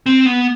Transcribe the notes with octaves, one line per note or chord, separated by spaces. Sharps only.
C4
B3